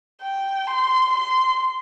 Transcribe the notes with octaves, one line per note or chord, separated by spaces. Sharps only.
G5
C6
C6